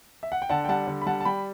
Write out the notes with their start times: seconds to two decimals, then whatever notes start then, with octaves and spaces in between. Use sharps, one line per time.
0.23 E5
0.32 F#5
0.42 G5
0.49 D3 F#5 A5
0.64 G5
0.69 G3 F#5 A5
0.87 D3
1.01 B5
1.06 G3 F#5 A5
1.20 A5
1.25 G3 G5 B5